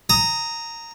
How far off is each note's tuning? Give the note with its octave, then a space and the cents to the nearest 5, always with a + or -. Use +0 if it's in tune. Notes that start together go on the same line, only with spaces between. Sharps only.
A#5 -15 D#6 +15